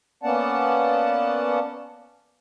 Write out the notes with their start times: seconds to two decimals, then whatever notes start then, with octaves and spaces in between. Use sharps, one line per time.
0.23 A#3 B3 C#4 D5 F#5 A5